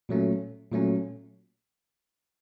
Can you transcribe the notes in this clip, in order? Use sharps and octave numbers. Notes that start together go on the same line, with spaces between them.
A#2 F#3 A3 C#4
A#2 F#3 A3 C#4